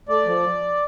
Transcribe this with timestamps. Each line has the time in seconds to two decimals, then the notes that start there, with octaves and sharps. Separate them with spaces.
0.09 A3 D5
0.26 F3